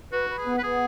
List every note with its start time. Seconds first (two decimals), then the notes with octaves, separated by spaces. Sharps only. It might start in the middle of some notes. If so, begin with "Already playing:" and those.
0.12 F#4 B4
0.30 B4
0.38 G#4
0.46 B3
0.58 B4
0.63 B3 G#4